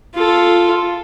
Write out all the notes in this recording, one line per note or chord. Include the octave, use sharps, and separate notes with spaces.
F4 A4